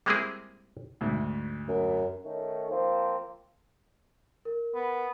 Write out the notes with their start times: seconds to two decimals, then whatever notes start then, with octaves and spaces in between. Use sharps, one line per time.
0.06 G3 G#3 A#3 C4 E4 G#4
1.01 D2 G#2
1.68 F#2
2.24 D#3 A3 C#4
2.70 F3 A#3 C4
4.45 A#4
4.75 B3